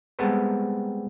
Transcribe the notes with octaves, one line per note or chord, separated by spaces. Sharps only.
G3 G#3 B3 C4 A4 B4